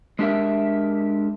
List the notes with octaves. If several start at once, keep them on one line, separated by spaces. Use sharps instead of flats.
G#3 D4 G4 A#4 E5